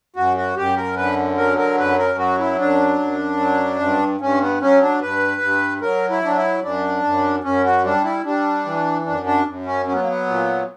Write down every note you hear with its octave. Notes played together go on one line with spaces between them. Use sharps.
F#2 F#4
F#4
F#2 G4
A#4
D3 B4
F#3 A#4
A#4
F#2 B4
A#4
F#3 F#4
E4
F#2 D4
F#2
F#3
G2
G2 C#4
B3
F#3 C#4
D4
G2 B4
G2
F#3 A#4
E4
F#3 D4
E4
F#2 D4
F#2
F#2 C#4
F#4
G3 D4
E4
G3 D4
E3
F#2 D4
D4
F#2
C#4
F#3 C#4
B3
A#3
B3
A#2